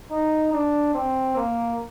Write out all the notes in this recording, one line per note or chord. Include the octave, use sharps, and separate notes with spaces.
D#4
D4
C4
A#3